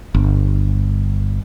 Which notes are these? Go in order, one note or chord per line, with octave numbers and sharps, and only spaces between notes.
G1